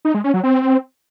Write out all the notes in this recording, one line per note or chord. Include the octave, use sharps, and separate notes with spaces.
D#4
G#3
C#4
F#3
C4